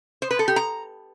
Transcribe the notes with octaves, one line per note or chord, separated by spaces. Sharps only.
C5
B4
A4
G4
A#5